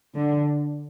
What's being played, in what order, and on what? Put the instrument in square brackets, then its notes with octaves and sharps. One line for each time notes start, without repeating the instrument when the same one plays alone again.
[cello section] D3